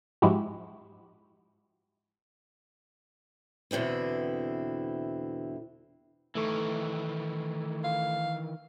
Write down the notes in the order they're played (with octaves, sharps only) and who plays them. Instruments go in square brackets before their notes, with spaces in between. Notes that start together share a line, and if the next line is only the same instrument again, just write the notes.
[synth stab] G#2 F3 G#3 E4 F#4 G4
[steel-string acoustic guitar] E2 B2 D3 C4 E4
[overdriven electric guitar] D#3 E3 [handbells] A3 A4 C#6
[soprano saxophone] F5